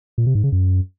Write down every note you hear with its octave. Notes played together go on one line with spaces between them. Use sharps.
A#2
C3
G#2
C#3
F#2